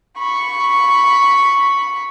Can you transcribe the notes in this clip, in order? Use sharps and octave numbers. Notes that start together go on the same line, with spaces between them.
B5 C#6